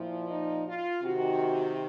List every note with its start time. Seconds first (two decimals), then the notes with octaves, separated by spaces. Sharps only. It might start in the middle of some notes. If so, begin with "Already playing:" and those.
Already playing: A#2 F3 E4
0.29 D#4
0.66 F4
1.03 C3 D#3 F#4